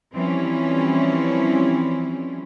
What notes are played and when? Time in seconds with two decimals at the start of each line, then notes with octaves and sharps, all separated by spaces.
0.14 E3 F3 G3 C4 C#4 E4